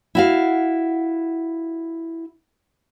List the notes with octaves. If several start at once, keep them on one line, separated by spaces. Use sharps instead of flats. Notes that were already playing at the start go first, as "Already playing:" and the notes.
E4 F#4 F5